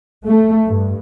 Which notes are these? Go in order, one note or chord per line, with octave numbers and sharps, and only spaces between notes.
A3
G2